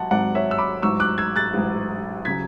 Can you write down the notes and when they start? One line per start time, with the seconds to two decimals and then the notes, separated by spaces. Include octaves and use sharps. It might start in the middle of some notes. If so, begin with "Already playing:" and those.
Already playing: G#1 F#3 F#5 A5
0.10 G#1 G#2 F#3 D5 F#5
0.35 C#5 E5
0.51 E6
0.58 B5 D6
0.82 A1 G#2 F#3 C#6 E6
1.00 D6 F#6
1.18 E6 G#6
1.36 F#6 A6
1.53 A1 G#2 F#3
2.25 C#3 F#3 G#6 B6